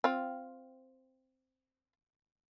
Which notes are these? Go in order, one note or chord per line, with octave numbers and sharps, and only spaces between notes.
C4 F4